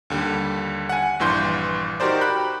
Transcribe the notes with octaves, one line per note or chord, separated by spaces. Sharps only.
D#2 D3 G3
F#5 G#5
A#1 G2 E3 C6 G6
D#4 F#4 G4 A#4 C5 D5
G5 B5 F#6